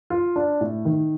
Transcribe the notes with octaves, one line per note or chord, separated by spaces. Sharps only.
F4
D4
A2
D#3